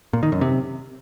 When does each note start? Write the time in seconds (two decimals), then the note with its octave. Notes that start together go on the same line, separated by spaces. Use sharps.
0.13 A#2
0.23 D#3
0.32 F#2
0.41 C3